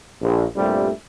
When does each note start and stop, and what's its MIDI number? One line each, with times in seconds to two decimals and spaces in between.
0.21 0.43 34
0.55 0.88 36
0.55 0.88 43
0.55 0.88 46
0.55 0.88 55
0.55 0.88 57